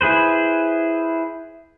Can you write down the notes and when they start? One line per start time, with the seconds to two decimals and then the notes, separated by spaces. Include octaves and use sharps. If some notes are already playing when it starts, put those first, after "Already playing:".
0.01 E4 G#4 B4 C5